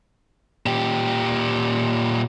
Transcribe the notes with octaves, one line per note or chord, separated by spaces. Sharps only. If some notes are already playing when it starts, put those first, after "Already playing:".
A#2 G4